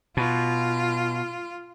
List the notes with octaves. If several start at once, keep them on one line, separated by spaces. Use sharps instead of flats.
B2 F4